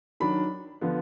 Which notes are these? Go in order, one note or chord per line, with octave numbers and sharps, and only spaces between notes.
D#3 F#3 D4 B5
D3 F3 B3